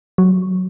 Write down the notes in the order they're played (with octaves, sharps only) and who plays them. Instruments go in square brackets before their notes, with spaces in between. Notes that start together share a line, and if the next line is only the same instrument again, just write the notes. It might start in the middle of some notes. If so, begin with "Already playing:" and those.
[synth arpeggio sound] F#3